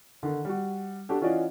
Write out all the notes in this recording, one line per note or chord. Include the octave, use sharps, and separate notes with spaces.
D3 D#3
G3 F#4
D4 F#4 G4 A4
E3 C#4 F4 F#4 D5 D#5